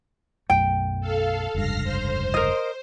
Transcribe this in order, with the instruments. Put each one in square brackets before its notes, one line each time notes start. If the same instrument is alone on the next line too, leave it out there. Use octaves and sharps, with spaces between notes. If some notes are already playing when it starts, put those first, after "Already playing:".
[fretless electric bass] B1 F#2 A3 [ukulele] G5
[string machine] A4 F5
[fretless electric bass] F1 C#2 G2 [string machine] F6 A#6 C7
[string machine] C5
[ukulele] A#4 D#5